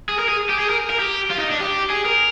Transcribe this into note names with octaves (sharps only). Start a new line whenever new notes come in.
G#4
A#4
G#4
G4
G#4
A#4
A#4
G4
F4
D#4
D4
G4
G#4
A#4